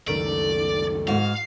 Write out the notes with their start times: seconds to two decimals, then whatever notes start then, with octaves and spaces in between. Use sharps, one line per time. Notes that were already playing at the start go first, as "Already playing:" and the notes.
0.08 C#2 F#2 D#3 A3 A#4 D5
1.08 G#2 F#4 F5